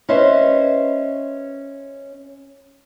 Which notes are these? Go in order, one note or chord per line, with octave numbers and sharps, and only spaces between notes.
C#4 B4 C5 D#5 E5